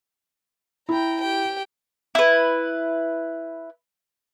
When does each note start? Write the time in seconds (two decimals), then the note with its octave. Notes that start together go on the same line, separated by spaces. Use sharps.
0.89 E4 G5 A#5
1.21 G4 G5
2.15 E4 B4